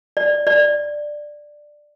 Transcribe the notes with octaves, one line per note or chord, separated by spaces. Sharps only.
D5
D5